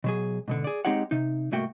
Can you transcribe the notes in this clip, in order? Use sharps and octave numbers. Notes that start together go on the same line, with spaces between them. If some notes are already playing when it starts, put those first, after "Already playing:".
B2 F#3 G#4
G#2 B2 D3
G#4 D5
G#3 C4 D#4 G4 C#5 F#5
C3 D#4
C2 G#2 A3 A#3 F#4 G5